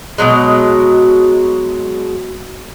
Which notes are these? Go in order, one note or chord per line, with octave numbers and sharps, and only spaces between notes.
B2 D3 F#3 G#3